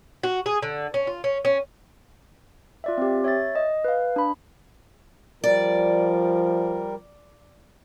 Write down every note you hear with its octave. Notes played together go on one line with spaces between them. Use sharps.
F#4
G#4
D3
C#4
F4
C#4
C#4
F4 D5 E5
C4 G4
C#5 E5 A6
D#5
B4 F5
D4 B5
F3 G3 A#4 D5